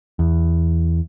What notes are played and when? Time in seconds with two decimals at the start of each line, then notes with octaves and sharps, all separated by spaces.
0.19 E2